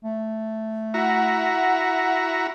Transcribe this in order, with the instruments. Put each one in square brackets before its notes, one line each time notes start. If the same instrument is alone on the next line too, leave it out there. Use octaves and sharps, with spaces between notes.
[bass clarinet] A3
[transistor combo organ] E4 F#4 A#5 [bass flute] F#5